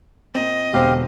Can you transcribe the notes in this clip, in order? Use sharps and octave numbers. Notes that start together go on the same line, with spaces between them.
A#2 C4 D#5
E1 B2 D3 C4 G4 C5 F5